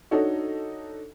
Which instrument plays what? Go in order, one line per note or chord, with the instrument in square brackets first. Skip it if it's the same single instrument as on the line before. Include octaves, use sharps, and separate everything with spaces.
[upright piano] D4 D#4 F#4 A4 C#5